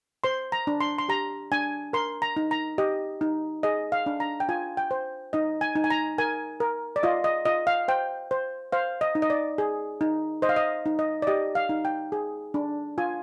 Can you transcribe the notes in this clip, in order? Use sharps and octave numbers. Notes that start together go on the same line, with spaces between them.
C5 C6
A#5
D4
C6
C6
G4 A#5
D4 G#5
A#4 C6
A#5
D#4
A#5
G4 D#5
D#4
G#4 D#5
F5
D4
A#5
G5
F4 G#5
G5
C5
D#4 D#5
G#5
D#4
G#5
A#5
A#4 G#5
A#4
D5
F4 D#5
D#5
F4 D#5
F5
C5 G5
C5
C5 F5
D#5
D#4
D#5
D5
G#4
D#4
C5 D#5
F5
D#5
D#4
D#5
D5
G4 D#5
F5
D#4
G5
G#4
D4
F4 G#5